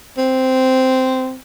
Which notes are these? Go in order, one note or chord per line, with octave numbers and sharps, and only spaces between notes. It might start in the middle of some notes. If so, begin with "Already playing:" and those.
C4